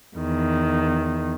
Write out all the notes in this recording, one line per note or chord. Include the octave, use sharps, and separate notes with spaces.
E2 D#3